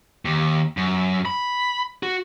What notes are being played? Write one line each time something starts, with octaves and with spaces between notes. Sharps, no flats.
D#2
F#2
B5
F#4